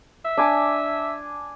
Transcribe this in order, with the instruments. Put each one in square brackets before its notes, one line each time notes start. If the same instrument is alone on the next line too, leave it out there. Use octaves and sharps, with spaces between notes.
[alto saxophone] E5
[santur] D4 G#5 D6